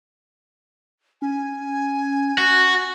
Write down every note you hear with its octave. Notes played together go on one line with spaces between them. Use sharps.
C#4 G#5
F#4